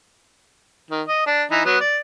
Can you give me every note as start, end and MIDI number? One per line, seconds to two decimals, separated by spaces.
0.90 1.02 51
1.08 1.24 75
1.26 1.43 62
1.51 1.61 52
1.51 1.61 63
1.65 1.77 54
1.65 1.77 59
1.81 1.98 74